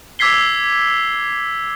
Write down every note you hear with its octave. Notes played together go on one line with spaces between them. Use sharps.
D6 E6 G#6 B6 C7 G7